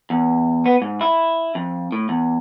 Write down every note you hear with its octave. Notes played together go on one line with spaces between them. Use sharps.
E2
B3
G#2
E4
F2
A2
E2